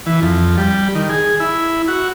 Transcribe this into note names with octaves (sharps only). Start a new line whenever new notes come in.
E3
F2
G3
D#3
G#4
E4
F#4